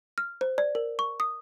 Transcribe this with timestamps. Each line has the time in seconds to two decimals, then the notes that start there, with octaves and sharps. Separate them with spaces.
0.18 F6
0.41 C5
0.58 D5
0.75 A#4
0.99 C#6
1.20 D#6